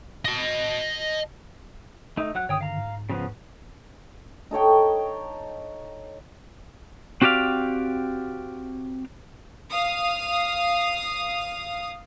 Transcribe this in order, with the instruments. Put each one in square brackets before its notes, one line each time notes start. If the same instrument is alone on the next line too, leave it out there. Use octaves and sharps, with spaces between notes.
[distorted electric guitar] D#5 A5
[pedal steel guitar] A3 D#4
F#3 F#5 F#6
[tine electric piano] G2 D3 D#3 [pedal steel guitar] C#5 G5 D#6
[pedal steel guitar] F5 A#5
[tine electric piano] G#2
[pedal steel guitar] C#3 F3 B3
[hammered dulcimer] D#4 A4 C#5 G5
[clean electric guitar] C4 F#4 G4 D5 F5
[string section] F5 D#6